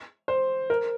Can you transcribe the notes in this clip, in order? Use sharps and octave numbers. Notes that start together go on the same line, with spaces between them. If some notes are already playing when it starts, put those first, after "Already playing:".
C5
A#4